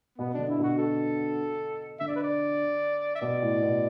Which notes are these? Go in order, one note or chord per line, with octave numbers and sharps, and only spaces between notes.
B2 B3
D3 D4
E4
B2 F#4
A4
D3 E5
D5
B4
D5
E5
B2 D5
A2
B2